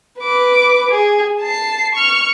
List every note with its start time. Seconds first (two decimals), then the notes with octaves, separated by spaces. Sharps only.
0.20 B4 D6
0.91 G#4
1.41 A5 C7
1.94 C#6 F6